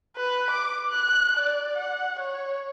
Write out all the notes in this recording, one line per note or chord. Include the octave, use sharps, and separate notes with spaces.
B4
D6
F#6
D5
F#5
C#5